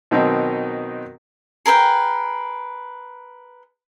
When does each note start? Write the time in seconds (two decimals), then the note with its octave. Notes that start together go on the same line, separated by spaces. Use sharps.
0.11 B2 D#3 F#3 C4 D#4
1.66 G#4 A#4 B4 G5